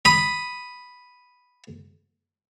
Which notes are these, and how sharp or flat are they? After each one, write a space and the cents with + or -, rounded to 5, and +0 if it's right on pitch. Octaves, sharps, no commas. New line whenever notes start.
B5 +0 D#6 +0